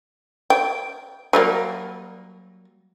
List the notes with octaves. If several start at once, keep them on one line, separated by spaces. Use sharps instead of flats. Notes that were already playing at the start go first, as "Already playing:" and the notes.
G5
F#3 G3 A#3